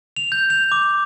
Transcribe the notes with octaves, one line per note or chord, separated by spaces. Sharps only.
F7
G6
F7
D6